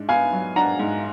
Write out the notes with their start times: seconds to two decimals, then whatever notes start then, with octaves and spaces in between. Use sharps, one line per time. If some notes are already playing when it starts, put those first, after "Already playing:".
Already playing: G#2 D4
0.09 B3 F5 G#5
0.33 F#3
0.56 D4 F#5 A#5
0.80 G#2